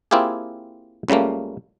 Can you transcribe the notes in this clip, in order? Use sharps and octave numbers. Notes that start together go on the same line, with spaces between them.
A#3 C4 E4 F4 G4 G#4
C#2 C#3 G3 A3 A#3